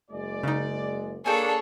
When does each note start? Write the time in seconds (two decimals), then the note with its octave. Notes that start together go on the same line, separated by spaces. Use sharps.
0.11 F#1 G#3 D5
0.43 C#3 D#4
1.26 A#3 D4 G#4 A4 C#5 G5 G#5